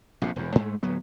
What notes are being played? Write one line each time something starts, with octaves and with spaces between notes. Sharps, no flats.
A#1 F2 C3
E1 E2
G#2 G#3 A3
D1 F#3 B3